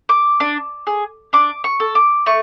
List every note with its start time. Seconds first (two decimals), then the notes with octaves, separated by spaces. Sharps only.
0.09 D6
0.40 D4
0.87 G#4
1.33 D4 D6
1.64 C#6
1.80 A4
1.95 D6
2.26 A3 C#6